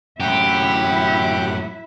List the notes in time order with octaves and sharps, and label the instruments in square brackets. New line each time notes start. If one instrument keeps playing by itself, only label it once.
[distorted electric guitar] F#2 A2 [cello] E4 E5 [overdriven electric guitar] G4 [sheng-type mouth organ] F#5